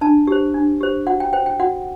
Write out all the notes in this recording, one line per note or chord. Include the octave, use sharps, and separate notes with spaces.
D4 A5
G4 C5
D4
G4 C5
F#4 F#5
G5
C5 G5
G5
F#4 F#5